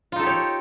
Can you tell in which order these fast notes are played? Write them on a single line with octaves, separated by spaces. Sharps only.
F4 D#4 A4 G4 C#5